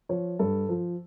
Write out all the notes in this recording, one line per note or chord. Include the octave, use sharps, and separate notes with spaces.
F3 C#5
G2 A4
F3